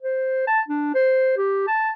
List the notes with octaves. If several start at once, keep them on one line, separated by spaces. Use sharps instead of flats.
C5
A5
D4
C5
G4
A5